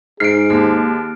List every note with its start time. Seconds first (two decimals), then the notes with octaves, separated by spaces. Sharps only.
0.20 G#2 G#4 F6 C7 D7
0.50 D#2 F6